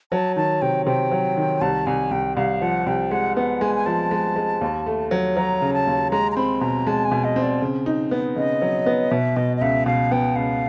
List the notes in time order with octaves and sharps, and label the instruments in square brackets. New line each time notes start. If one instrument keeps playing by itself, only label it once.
[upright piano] F#3 [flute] A5
[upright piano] D#3 [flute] A5
[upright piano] C3 [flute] G5
[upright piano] C3 [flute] G5
[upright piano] F#3
D#3
[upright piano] C2 [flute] A5
[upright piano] C2 [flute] G#5
[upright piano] C2 [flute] G5
[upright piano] C2 [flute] F5
[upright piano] F3 [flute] F#5
[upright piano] C2 [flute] G5
[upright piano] G#3 [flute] F#5
[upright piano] B3 [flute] F#5
[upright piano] G#3 [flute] G#5
[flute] G#5
[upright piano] F3 [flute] A5
[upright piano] G#3
G#3
D#2
A3
F#3
[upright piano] F#3 [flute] A#5
[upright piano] C#3
[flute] A5
[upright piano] D#2
[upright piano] G#3 [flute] A#5
[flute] A#5
[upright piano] C4 [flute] B5
[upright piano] B2 [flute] A#5
[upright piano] G#3 [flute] A5
[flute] G#5
[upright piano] B2
[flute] D#5
[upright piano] C4
[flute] D5
[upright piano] C#3
D#4
B3
[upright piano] C#3 [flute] D#5
[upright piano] F#3
B3
[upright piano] B2 [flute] E5
[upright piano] B2 [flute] D#5
[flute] D#5
[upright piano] C#2 [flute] E5
[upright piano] B2 [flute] F5
[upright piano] B3 [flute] G5
[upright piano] C#2 [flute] F5